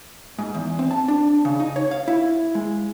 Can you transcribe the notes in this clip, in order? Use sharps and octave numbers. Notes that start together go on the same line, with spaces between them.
G#2
E2
C4
A5
D4
C#3
D#4
C#5
F5
E4
G#3